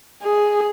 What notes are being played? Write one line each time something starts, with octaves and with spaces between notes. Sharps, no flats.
G#4